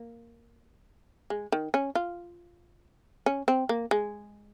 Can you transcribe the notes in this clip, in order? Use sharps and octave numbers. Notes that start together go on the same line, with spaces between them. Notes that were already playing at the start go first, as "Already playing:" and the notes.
Already playing: A#3
G#3
D#3
C#4
F4
C#4
C4
A#3
G#3